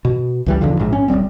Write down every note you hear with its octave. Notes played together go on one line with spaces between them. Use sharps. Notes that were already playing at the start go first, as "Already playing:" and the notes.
B2
C#2 E3 G3
B1 E2 D3 F3
A#1 G#2
C#4
D#1 G#2 G3 C4